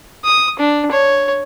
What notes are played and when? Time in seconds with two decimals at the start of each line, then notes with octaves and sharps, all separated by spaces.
0.25 D#6
0.59 D4
0.91 C#5